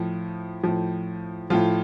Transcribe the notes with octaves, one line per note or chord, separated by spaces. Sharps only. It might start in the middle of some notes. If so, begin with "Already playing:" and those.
Already playing: A2 F3
A2 F3
A2 F3 F4